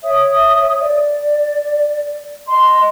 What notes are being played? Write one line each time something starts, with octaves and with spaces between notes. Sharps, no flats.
C#5 E5 D#6
D5
D#5 C6